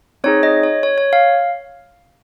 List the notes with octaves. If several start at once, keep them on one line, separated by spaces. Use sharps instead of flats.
C4 D#4 G#4 C#5
D#5
C#5
C#5
C#5
F5